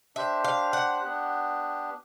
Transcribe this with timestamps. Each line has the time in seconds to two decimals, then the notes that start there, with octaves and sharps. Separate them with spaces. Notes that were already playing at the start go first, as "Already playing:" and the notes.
0.16 D4 G4 C5 E5
0.44 F5
0.73 F#5
1.02 B3 D4 G4